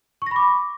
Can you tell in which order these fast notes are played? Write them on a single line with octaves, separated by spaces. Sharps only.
C#6 A#6 B5 D6